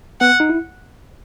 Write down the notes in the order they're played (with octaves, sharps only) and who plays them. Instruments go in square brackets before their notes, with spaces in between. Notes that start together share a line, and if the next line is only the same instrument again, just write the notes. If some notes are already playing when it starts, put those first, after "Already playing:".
[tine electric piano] B3 [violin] F#5
[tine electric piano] D#4
E4